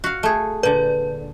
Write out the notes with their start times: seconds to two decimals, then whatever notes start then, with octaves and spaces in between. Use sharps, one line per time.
0.04 F#4 F5
0.23 A3 G#4
0.63 A#2 D3 B4